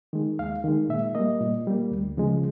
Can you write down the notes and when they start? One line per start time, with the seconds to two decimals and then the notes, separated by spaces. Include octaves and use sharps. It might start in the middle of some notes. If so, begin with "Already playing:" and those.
0.13 D#3 G#3
0.39 D#2 F5
0.64 D#3 G#3
0.89 A#2 E5
1.15 G3 A#3 D#5
1.41 A#2
1.67 G3 A#3
1.91 D2
2.17 C#3 F3 G#3